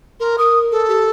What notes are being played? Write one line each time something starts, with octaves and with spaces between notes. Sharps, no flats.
A#4 C6
A#4 D#6
A4
G4